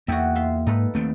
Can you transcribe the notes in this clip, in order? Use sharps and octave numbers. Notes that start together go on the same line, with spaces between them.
E2 A#3 F#4 E5 G5
F4 E5 C6
G#2 D#4 A4 B4
D#2 A3 C4